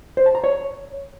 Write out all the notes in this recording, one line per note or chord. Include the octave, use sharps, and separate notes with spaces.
C5
A5
A#5
C#5